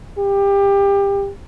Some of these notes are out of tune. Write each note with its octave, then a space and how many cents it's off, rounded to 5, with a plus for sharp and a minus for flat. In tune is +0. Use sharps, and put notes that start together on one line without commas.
G4 +25